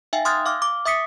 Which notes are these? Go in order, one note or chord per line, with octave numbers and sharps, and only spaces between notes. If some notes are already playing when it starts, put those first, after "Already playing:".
D#4 E5 F5 G5 G#5
C6 D#6 F6 F#6 G#6 A6
F5 D6 F6
D6
E5 D6 D#6 B6 C#7